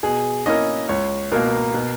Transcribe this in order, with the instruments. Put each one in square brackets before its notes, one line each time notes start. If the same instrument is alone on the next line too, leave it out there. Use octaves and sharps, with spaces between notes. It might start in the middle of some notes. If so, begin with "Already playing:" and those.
[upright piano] B2 [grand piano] G#4
[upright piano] A#3 C#4 E4 A#4 [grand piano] D#5
[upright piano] C#2 [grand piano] C#5
[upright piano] B2 A#3 [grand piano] A#4
[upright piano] B2